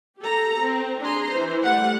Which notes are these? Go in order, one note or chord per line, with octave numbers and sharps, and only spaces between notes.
G4 A4 A#5
C4
D4 G#4 A#5 C6
E3 C5
G3 A3 F#5